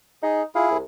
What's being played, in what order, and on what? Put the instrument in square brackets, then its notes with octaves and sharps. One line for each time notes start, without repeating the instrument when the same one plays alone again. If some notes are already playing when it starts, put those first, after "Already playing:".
[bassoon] D#4 [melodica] G#4
[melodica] E4 G#4 [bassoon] F4
[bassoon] C2